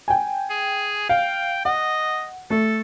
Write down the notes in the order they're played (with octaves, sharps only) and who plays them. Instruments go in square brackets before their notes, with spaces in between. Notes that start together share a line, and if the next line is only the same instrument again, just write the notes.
[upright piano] G5 G#5
[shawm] G#4
[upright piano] F5 [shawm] G5
[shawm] D#5 [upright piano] F#5
[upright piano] A3 [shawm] A4